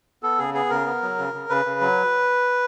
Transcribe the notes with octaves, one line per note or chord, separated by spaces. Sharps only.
B3 A4
C#3 G#4
B3 G#4
C#3 A#4
B3
F#3
C#3
C#3
C#3 B4
C#3
F#3